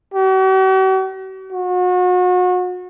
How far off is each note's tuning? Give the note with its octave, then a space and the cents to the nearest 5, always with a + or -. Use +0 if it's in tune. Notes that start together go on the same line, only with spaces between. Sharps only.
F#4 +45
F#4 -35